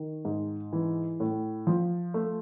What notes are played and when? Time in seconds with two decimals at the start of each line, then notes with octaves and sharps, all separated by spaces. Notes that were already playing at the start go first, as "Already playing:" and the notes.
Already playing: D#3
0.25 G#2
0.73 E3
1.20 A2
1.67 F3
2.14 A3